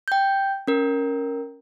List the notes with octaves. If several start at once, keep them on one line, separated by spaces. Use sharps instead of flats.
G5 G6
C#4 A#4